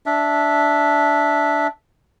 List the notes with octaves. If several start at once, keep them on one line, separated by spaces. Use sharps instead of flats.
D4 E5